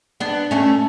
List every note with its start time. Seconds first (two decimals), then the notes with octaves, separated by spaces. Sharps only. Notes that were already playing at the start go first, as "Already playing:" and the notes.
0.20 B3 D4
0.51 A3 C#4